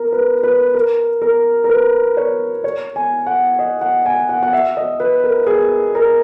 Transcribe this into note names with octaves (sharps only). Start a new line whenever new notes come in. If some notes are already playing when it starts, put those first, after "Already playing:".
Already playing: A#4
B4
B4
A#4
A#4
A#4
B4
C#5
C#5
G#5
F#5
D#5
F#5
G#5
F#5
F#5
E5
D#5
B4
A#4
G#4
A#4